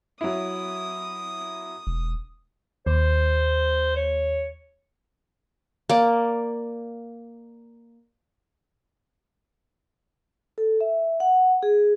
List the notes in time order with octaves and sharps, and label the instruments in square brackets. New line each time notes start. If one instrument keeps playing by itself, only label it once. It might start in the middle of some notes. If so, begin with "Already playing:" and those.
[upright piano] F#3 E4 [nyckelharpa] D#6
[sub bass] E1
[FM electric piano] D#2 [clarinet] C5
[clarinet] C#5
[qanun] A#3 D5
[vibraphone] A4
E5
F#5
G#4